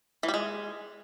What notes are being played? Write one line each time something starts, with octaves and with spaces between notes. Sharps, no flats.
E3
G3
G#3